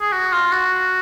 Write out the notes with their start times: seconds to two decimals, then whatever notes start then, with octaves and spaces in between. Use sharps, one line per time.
0.01 G#4
0.12 F#4
0.32 F4
0.52 F#4